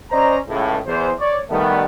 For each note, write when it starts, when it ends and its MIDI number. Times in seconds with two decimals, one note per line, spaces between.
0.10 0.36 61
0.10 0.36 72
0.10 0.36 74
0.10 0.36 75
0.10 0.36 82
0.48 0.77 37
0.48 0.77 45
0.86 1.10 40
0.86 1.10 72
1.19 1.38 73
1.19 1.38 74
1.50 1.84 51
1.50 1.84 55
1.50 1.84 57
1.50 1.84 59